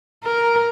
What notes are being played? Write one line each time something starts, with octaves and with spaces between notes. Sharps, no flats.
A#4